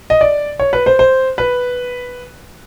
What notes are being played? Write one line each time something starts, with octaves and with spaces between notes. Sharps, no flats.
D#5
D5
C#5
B4
C5
C5
B4